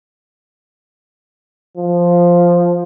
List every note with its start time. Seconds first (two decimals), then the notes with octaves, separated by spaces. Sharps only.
1.77 F3